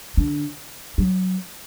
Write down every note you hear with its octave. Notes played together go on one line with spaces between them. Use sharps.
D3
F#3